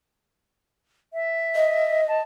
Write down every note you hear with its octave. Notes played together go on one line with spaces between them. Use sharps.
E5
D#5
A5